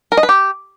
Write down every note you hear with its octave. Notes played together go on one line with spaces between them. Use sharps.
A#4
D#5
B4
G4